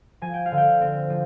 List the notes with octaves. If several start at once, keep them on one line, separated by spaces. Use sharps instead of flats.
F3 G#5
G5
F5
D3
G5
C4
F3